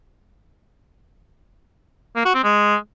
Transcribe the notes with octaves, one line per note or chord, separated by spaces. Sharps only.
A#3
F#4
C4
G#3